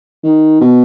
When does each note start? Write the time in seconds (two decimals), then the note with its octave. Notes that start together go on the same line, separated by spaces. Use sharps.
0.24 D#3
0.61 B2